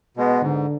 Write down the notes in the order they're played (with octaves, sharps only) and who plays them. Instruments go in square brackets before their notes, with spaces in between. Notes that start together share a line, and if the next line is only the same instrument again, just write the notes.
[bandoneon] B2 G#3 B3
[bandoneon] G#2 [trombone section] D3